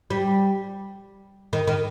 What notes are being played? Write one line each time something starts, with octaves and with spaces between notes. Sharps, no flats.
G3
D#3
D#3